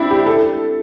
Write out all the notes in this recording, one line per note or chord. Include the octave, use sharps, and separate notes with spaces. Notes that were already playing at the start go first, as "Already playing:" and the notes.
Already playing: C4 D4 E4
G4
A4